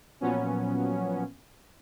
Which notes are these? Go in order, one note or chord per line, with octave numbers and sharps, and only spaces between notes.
A#2 F3 F#3 B3 C#4